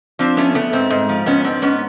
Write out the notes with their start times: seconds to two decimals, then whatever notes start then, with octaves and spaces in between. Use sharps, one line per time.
0.19 F3 C4 D4
0.37 A3 B3 C#4
0.55 A3 B3
0.73 G#2 C4
0.90 G#2
1.09 F3
1.26 G#2 B3 C#4
1.44 G#2 C4 D4
1.62 G#2 B3 C#4